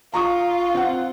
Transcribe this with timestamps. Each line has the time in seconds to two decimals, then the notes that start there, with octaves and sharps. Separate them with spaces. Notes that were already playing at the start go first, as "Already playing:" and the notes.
0.14 F4 A#5 C#6 D#6
0.75 C4 F#5